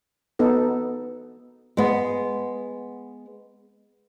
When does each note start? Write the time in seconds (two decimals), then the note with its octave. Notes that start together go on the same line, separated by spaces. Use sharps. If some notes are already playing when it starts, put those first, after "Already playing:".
0.39 B3 D#4 A4
1.77 G#3 B3